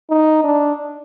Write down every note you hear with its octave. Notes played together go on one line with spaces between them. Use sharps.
D#4
D4